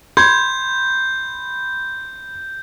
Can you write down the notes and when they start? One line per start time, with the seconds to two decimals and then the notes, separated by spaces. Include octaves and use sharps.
0.17 B5 C6 G6 G#6